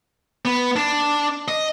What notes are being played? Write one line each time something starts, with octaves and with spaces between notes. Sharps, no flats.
B3
D4
D#5